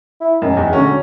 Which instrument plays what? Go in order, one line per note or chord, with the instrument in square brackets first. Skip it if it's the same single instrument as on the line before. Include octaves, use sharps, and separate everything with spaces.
[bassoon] E4
[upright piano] E1 F#2 [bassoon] D#3
[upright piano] E2
[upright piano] D3 C#4 [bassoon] F#3